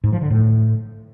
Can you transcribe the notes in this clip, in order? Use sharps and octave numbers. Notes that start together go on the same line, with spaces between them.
G#2
F3
D3
A2